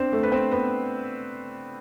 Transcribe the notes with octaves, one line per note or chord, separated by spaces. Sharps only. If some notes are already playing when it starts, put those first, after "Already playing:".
Already playing: C4 D4 C5 D5
A3 A4
B4
C4 C5
B3 B4